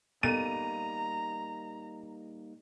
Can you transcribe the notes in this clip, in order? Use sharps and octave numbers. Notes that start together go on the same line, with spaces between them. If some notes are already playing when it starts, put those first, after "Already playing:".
G3 A#3 B3 D#4 A4 A#5 D#7